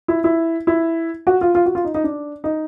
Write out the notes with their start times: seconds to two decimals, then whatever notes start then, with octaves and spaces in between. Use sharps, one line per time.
0.08 E4
0.24 E4
0.67 E4
1.27 F#4
1.41 F4
1.55 F4
1.66 F#4
1.75 F4
1.84 D#4
1.95 D#4
2.04 D4
2.44 D#4